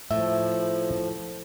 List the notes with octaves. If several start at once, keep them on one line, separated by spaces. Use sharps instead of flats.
A2 F3 E5